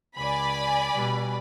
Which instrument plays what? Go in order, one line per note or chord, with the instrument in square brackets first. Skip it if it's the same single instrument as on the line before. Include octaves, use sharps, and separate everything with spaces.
[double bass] C#2 [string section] D5 G#5 B5
[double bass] B2 G3